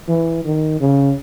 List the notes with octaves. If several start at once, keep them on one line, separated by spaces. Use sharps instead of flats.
E3
D#3
C#3